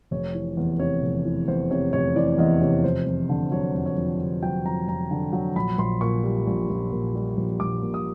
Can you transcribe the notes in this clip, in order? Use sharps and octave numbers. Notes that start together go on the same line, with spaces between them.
F1 C#5
E3
E2
C3 C#5
F1
E3
E2 C5
C3 C#5
F1 C#5
E3 D5
E2 D#5
C3 C#5
F2 C5
F2
D3
F#3 C#5
F2
C#5
F2
D3
F#3 G5
F2 A#5
F2 A#5
D3
F#3
A#1 B5
A#1 C6
A#2 C#6
G3
A#1
A#1
A#2
G3
A#1
A#1 D6
A#2
D#6